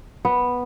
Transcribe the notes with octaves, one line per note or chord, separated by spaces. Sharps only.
B3